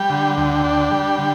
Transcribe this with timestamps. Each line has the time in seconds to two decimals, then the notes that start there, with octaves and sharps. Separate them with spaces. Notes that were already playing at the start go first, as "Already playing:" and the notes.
Already playing: G3 G5
0.10 D3
0.37 D2
0.64 D4
0.91 G3
1.18 D3